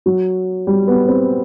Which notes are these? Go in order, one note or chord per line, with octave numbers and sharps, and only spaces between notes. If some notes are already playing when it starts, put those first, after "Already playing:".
F#3
G3
B3
C4